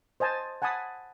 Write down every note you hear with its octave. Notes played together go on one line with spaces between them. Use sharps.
C5 D#5 G#5 A5
F#5 G#5 A5 B5 D#6